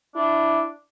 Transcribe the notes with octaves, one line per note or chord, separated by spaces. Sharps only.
D4 E4